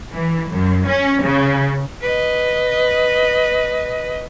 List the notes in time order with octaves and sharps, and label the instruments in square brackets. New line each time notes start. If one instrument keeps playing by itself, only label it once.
[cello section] E3
F#2
C#4
C#3
[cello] B4 D#5